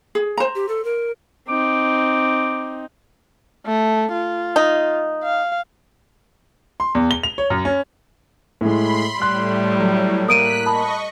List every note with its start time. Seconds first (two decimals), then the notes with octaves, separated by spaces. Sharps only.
0.15 G#4
0.37 C5 A#5
0.55 G4
0.68 A4
0.85 A#4
1.48 C4 D#4 D6
3.66 A3
4.12 F4
4.56 D#4
5.23 F5
6.80 C6
6.95 E2
7.11 G7
7.23 F7
7.38 C#5
7.50 F#2
7.65 C#4
8.61 A2 G#3 B5 C6
9.22 A2 G3 C6 F#6
9.79 F#3
10.29 A#3 D#6 F#6 B6 D7 D#7
10.66 D#5 A5 B5 C#6 D#6